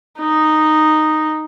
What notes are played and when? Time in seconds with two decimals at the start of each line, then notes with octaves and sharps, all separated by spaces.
0.19 D#4